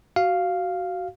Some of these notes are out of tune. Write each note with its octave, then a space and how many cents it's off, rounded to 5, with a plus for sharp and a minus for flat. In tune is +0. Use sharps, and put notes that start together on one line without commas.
F#4 +15 F5 +0